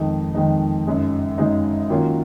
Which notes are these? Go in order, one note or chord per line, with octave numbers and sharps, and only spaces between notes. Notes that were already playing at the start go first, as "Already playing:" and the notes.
Already playing: F2 D#3 G#3 D#4
F2 D#3 G#3 D#4
F#2 C#3 G#3 D#4
F#2 C#3 G#3 D#4
D#3 F#3 A#3 C#4 F4